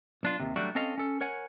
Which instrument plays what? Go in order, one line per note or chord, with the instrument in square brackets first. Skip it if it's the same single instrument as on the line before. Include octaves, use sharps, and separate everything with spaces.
[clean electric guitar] B1 D4 F4
D#2 C3
F#3 G3 A3 D4 F#4
C4 C#4 A4 D#5 F5
C#4 A4
A#4 C#5 F#5 G#5